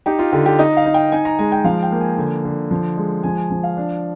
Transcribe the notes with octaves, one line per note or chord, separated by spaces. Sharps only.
D#4 G4
F4
D3 G4
G4
D#4 D#5
F5
D#4
G5
D#4 G#5
A#5
G#3 G#5
G5
F3 F5
G5
A#3
G#5
D3
D3
F3
G#3
F3 G#5
G#5
F3
F5
D4